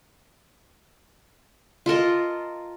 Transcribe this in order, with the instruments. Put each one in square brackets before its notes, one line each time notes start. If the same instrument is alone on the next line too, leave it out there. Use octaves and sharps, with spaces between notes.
[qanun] F4 A4 A#4 D#5